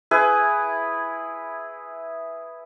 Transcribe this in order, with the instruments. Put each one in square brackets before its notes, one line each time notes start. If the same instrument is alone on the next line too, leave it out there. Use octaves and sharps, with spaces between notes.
[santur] E4 G#4 B4